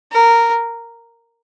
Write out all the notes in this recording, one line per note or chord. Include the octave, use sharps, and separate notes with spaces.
A#4